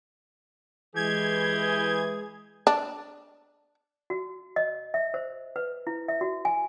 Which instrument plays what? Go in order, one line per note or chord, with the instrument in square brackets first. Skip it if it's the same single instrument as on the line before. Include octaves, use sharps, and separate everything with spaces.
[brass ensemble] E3 [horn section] G#3 G#4 [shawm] G4 [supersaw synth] G#6
[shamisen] D4
[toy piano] F#4
D#5
E5
C5
B4
E4
E5
F#4
G#5